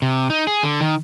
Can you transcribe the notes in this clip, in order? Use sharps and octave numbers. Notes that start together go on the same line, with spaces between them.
C3
D#4
G#4
D3
D#3